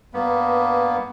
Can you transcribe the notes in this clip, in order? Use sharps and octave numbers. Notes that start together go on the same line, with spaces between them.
G2 A#3 B3